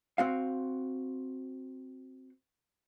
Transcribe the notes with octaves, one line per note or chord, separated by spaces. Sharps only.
C4 F#4 F5